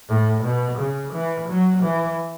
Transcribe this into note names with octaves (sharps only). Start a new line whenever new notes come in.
A2
B2
C#3
E3
F#3
E3